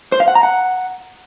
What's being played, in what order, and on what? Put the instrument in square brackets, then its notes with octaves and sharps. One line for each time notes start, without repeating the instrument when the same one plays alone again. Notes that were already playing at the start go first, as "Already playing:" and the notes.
[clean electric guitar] C5
F5
F#5
A#5
F#5